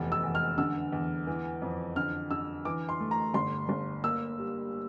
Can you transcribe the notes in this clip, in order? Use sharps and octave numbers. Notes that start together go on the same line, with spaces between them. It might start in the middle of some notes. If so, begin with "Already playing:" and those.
Already playing: F1 E2
E6
E2
F6
D3 E6
E2
E3
F2
D3 F6
D3 E6
E3 D6
C6
A3
A#5
G1 C6
G1
A#3 E6
G3